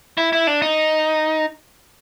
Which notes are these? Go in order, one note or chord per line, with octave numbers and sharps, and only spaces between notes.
E4
E4
D4
D#4